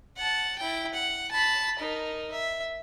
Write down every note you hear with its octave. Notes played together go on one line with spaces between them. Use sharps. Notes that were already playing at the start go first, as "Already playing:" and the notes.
F#5 A5
E4 G5
F#5
A5 B5
D#4 A#4
E5